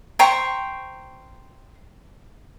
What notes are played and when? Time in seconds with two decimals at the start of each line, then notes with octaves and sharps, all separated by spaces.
0.19 C5 G5 A#5 C#6